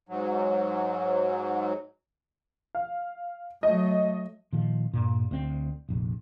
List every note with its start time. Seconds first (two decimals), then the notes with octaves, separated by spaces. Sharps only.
0.09 G#2 F#3
2.75 F5
3.63 F#3 A3 D#5
4.53 A#2 D#3 F3
4.93 G2 A#2
5.31 D2 C4
5.89 F1 A#1